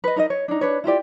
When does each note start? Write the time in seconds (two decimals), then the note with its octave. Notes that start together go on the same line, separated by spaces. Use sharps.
0.04 B4 D#5
0.16 D#4 A#4 D5 D#5
0.30 C#5
0.48 D4 D#4
0.61 D4 B4 C#5
0.84 E4 F4 G4 D5